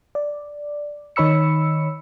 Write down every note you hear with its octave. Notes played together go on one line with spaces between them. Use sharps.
D5
D#3 D#4 C#5 B5 E6 C#7